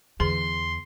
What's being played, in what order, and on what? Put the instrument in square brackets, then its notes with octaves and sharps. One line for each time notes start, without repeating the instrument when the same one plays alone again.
[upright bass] E2 [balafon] D3 G#4 [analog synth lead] C6